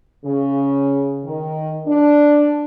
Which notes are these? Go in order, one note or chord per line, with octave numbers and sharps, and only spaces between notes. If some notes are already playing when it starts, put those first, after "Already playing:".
C#3
D#3
D4